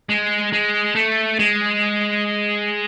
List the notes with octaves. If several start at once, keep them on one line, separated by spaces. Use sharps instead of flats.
G#3
G#3
A3
G#3